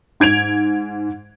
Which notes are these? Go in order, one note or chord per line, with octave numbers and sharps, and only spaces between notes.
G#2 G#6 D7 F7